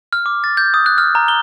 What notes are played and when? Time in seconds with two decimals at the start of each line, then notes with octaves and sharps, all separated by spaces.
0.13 F6
0.26 D6
0.44 A6
0.57 G6
0.74 D#6
0.86 F#6
0.98 F6
1.15 A#5
1.28 G7